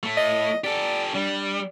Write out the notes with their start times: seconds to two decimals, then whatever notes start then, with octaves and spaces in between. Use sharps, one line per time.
0.03 A2 A3
0.17 D#5
0.64 G4 A4 D5
1.15 G3 D4